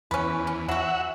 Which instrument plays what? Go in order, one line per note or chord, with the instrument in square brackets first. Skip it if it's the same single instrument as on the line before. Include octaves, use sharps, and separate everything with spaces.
[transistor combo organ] E2 [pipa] C#4 B4
[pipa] C#4
[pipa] F#3 F#4 [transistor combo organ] E5 F#5